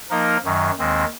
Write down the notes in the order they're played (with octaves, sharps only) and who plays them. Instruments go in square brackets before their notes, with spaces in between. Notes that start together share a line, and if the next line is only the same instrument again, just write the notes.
[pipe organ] F3 A#3 D#4 A#4 D#5
F#2 D#3 F#3
D#2 D#3 G#3 C4